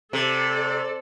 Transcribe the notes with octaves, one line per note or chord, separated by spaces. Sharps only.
C3 A4 D5